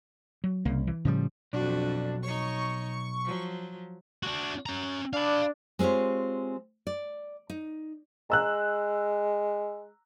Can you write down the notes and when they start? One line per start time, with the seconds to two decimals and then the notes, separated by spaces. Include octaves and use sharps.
0.44 F#3
0.65 C2 C#3 A#3
0.87 E3
1.05 A2 C#3 F3 G3
1.53 B1 F2 D4 F#4
2.23 D#4 C#5 C#6
3.25 F3 F#3
4.23 D4 F#4
4.66 C#4 A#5
5.13 D4 F5 B5
5.79 G#3 C4 F4 G4 C#5
6.87 D5
7.50 D#4
8.30 G#3 A#5 E6 F#6